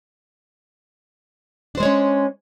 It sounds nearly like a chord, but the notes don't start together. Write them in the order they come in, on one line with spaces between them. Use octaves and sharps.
D4 C5 G#3 C#5 C#4